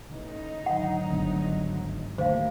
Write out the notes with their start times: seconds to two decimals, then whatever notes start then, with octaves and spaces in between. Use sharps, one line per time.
0.11 A1 D#4
0.66 G#1 D2 F#3 F#5
1.10 G1
2.18 G#1 D#2 A2 D3 A3 A#3 C5 F5